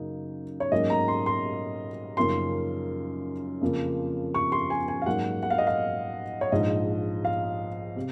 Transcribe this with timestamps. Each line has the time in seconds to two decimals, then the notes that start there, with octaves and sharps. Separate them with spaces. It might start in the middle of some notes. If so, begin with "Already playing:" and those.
Already playing: F#2 C#3 F#3 A#3 D#4
0.60 C#5
0.72 G#2 F#3 A#3 C#4 D#5
0.90 A#5
1.08 C6
1.26 C6
2.17 F#2 C#3 F3 A#3 D#4 C6
3.61 F2 C#3 F3 A#3
4.34 C#6
4.52 C6
4.70 G#5
4.88 G#5
5.02 F5
5.06 G#2 F#3 A#3 D#4 F#5
5.43 F#5
5.50 F5
5.58 D#5
5.67 F5
6.41 C#5
6.52 A#1 G#2 F3 D#5
7.25 F5
7.96 C3